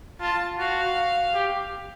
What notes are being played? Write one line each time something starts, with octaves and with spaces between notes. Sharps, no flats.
F4 A5
F#4 F5
G4